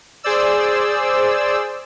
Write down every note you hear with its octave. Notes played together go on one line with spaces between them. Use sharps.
G#4 C5 D5 E6